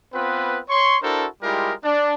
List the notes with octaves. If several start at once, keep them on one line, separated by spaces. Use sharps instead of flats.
B3 C4 F4 B4
C#5 C6 C#6
D4 E4 F#4 A4 A#4 C5
G3 G#3 E4 F4 G4 A#4
D4